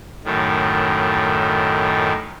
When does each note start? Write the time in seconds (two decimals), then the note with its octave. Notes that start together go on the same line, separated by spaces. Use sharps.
0.25 F#2 A2 D#3